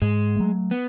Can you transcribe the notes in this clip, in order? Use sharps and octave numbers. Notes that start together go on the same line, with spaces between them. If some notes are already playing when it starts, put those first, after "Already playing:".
G#2 G#3
F#3 A3
B3